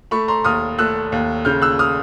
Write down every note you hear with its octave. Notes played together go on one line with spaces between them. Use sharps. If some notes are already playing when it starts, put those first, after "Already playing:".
A3 B5 C#6
A#5 C6
D#2 D#6 F6
A3 E6 F#6
D#2
C#3 F6 G6
E6 F#6
D#6 F6